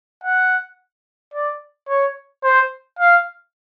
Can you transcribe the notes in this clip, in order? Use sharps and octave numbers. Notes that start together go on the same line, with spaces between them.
F#5
D5
C#5
C5
F5